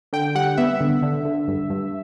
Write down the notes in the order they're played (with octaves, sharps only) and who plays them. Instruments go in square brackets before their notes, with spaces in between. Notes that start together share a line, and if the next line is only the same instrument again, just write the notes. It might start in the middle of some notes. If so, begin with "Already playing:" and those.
[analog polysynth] D3 G5
G3 F#5
B3 E5
D3
D3
D3
G2
G2